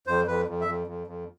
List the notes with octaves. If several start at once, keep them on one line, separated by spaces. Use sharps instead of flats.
F2 C5
F2 B4
F2
E5
F2
F2
F2